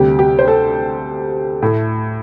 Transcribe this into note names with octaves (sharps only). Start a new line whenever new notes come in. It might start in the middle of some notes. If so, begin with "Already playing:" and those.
Already playing: D2 C3 G3 G4
G4
C5
A4
A2 A3